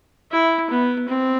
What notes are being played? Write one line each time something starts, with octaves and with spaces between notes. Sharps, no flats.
E4
B3
C4